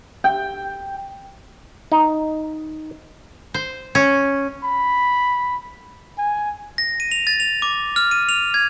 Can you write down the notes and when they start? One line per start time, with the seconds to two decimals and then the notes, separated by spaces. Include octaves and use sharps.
0.24 G5
1.92 D#4
3.54 C5
3.95 C#4
4.64 B5
6.18 G#5
6.78 A#6
7.00 D#7
7.11 F7
7.27 A6
7.40 F7
7.62 D6
7.96 F6
8.11 D#7
8.29 F7
8.54 G#6